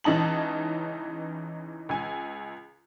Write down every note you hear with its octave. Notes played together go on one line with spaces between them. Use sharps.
C#2 E3 C#4 D#4 A5 F#7
C#2 G#5